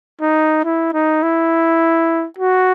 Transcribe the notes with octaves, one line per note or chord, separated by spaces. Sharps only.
D#4
E4
D#4
E4
F#4